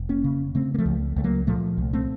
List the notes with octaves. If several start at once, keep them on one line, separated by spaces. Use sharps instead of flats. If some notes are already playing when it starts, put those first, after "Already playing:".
Already playing: F1
A#3 C#4
C#3
C#3 A3 C4
A#3
F3 A3
C#2
C#2 A3
F#3 A#3
A#2 F3 A3
C2
A3 C4